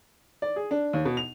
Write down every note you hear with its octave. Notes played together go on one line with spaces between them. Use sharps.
D5
G#4
D4
D#2
B2
F7